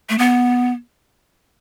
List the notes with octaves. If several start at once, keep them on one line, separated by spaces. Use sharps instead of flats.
A3
B3